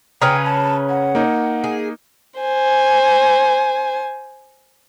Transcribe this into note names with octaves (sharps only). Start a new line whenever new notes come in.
C#3 C#4 B4 G5 A#5 D#6 F6
A5
F#5
A#3 D#4
G#4
C5 G#5